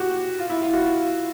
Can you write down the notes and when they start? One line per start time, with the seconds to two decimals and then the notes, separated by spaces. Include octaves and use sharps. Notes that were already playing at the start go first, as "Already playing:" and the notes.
Already playing: F#4 G4
0.39 F4
0.50 E4
0.62 F4
0.73 F#4